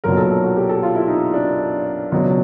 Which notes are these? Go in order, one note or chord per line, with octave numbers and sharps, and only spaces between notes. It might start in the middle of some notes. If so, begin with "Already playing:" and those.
B1 A#2 F#3 A#4
A4
A4
F#4
G4
A4
F4
E4
D#4
D4
C#2 B2 F#3